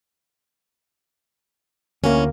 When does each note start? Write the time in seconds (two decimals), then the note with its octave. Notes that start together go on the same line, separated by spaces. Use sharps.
2.04 D2 E3 A#3 C#4